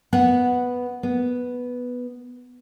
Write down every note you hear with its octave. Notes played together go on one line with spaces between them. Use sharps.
B3 F#5
B3